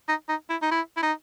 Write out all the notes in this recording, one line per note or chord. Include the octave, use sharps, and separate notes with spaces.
D#4
D#4
E4
D#4
E4
E4
D#4